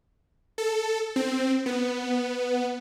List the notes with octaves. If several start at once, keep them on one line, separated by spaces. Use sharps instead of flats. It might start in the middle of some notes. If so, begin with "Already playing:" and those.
A4
C4
B3